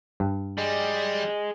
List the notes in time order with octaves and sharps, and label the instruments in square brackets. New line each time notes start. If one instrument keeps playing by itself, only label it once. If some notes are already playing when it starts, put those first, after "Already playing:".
[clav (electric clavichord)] G2
[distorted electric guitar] G3 [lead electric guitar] G#4 D#5